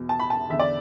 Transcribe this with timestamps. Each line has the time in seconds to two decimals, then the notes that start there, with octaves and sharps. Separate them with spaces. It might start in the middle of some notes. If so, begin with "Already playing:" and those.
Already playing: E2 B2
0.09 A5
0.20 B5
0.30 A5
0.49 E2 D3 E5
0.59 D5